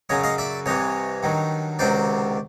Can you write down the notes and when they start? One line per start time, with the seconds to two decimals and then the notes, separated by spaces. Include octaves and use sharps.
0.09 F#2 C#3 F#3 C#5 D#5
0.23 D#5 F5
0.38 D5 E5
0.66 C2 C3 E3 C#5 D#5
1.23 G2 D#3 F#3
1.79 C#2 C3 D#3 F#3 C5 D5